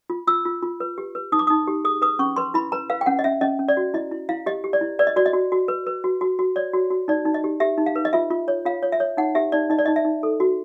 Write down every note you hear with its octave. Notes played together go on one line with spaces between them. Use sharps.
F4
F4 E6
F4
F4
B4
G4
B4
D#4 D#6
D6
D#4 D#6
G4
G#4 D#6
B4 D#6
C#4 C#6
B4 C6
E4 B5
B4 A#5
B4 F5
G5
C#4 F#5
D#5
C#4 E5
C#4 D#5
C#4
D5
F#4
E4 D#5
E4
E4 F5
G4 D#5
G4
D5
E4
B4 D5
D#5
F#4 D5
D#5
F#4
F#4
B4
B4
F#4
F#4
F#4
C#5 D5
F#4
F#4
D#4 D5
D#4
D#5
G4
G4 E5
D#4
F5
B4
D#5
F4 E5
F4
C#5
F4 F5
C#5
E5
C#5
D#4 F#5
G4 E5
D#4 D5
D#4 D#5
D5
D#4 D#5
E5
D#4
A4
F#4